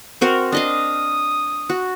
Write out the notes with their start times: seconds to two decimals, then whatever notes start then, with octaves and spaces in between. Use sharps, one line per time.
0.21 C4 F#4 A#4
0.52 D4 D#5 F5 D#6
1.69 F#4